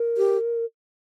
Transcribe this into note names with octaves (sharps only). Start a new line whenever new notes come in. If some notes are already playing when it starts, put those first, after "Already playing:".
Already playing: A#4
G4